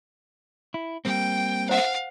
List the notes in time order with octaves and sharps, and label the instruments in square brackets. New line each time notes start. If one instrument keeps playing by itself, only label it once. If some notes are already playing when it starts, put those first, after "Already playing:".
[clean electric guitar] E4
[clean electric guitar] G3 A#3 C4 [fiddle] G5
[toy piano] C5 F#5 [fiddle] F5